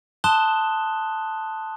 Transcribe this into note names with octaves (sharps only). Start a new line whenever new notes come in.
A5 C6 D#6 F#6 E7 G7